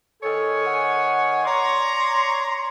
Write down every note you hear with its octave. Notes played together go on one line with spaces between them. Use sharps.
D#3 A4 C#5 G#5
F#5
C#5 D5 A#5 C6